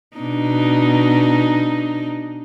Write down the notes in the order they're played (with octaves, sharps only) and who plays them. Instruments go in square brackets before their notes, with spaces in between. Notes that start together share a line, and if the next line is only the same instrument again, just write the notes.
[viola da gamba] B2 D4 D#4